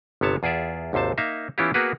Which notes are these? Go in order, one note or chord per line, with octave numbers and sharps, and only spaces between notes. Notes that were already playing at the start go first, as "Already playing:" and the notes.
G1 C3 B3 C#5 A5
E2 F4 G#4 D5 E5
G#1 D#2 C3 C5 A5
A#3 D#4 E5 F5
E3 B3 C#4 E4 F4 G4
A#3 B3 F#4 G#4 A#4 B4